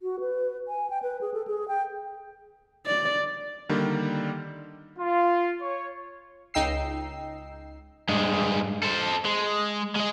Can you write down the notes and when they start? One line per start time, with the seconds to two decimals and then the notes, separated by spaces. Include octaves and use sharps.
0.02 F#4
0.20 B4
0.68 G#5
0.90 G5
1.02 B4
1.21 G#4
1.34 A4
1.48 G#4
1.68 G5
2.86 D5
3.69 D3 D#3 G3 A#3
4.98 F4
5.61 C#5
6.54 C#2 D#4 G5 E6 C7
8.09 G2 G#3
8.83 A4 C5
9.26 G#3
9.96 G#3 D#5